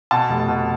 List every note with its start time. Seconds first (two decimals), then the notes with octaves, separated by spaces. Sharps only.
0.11 B2 A5
0.29 F1
0.48 B2